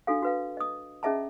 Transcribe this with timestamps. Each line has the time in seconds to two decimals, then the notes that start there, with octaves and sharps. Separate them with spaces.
0.07 D4 F#4 A4 F5
0.23 F#4 B4 F5
0.57 D#5 D#6
1.03 C#4 G#4 D#5 E5 A5 A#5